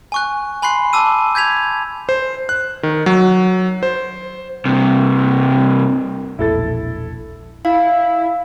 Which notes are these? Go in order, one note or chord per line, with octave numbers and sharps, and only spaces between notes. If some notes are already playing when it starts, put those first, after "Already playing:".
G#5 C#6 F#6
G#5 B5 C6 F#6 C7
A5 D6 E6 D#7
G6 G#6 B6 F7
C5
F#6
D#3
F#3
C5
G2 C3
E1 A#1 E4 A4 A6
E4 F5